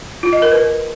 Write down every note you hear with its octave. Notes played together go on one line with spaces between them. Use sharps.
F4
D#5
A#4
B4